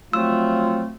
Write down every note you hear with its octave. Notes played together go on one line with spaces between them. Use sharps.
F3 F#3 A3 C4 F4 E6